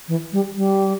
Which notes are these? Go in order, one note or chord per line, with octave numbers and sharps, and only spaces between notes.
E3
G3
G3